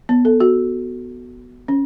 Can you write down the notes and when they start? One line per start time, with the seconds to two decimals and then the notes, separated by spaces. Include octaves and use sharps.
0.09 B3
0.25 A4
0.40 F#4
1.68 C#4